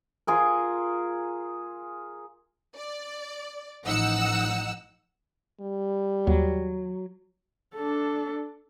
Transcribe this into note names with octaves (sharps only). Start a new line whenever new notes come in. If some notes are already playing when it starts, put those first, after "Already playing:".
F4 G#4 A#4
D5
A1 F3 D#4 F#5 E6
G3
D#2 F#3
D4 A4